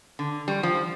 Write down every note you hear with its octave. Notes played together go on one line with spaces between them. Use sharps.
D3
G3
F3